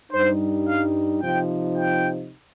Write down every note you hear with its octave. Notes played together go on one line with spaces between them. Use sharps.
G2 G3 D#4 C5
F5
C3 F3 D#4 G5
G5